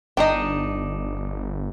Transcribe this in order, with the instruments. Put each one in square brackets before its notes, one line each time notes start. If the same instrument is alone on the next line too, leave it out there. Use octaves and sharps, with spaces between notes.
[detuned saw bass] G1 [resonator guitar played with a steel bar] D4 D#4 [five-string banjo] D#5 G5